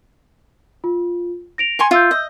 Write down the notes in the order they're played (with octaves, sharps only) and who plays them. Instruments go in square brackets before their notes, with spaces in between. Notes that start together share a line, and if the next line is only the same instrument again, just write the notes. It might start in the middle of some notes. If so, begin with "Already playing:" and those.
[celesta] F4
A#6 D7 F7
[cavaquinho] G#5 C6 C#6
[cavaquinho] F4 [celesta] E5 E6 G6
[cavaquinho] D#5